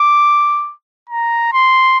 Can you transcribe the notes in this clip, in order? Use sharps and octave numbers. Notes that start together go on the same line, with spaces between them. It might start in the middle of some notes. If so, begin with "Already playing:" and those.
Already playing: D6
A#5
C6